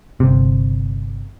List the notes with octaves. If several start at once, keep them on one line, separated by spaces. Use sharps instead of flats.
G1 C3